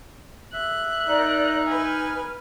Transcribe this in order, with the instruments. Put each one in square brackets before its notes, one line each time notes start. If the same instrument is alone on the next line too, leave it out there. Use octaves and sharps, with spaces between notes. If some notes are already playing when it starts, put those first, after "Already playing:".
[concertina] E5 [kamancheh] F#6
[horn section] D#4 [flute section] A#4 D5
[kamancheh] B4 G#5 [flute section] F6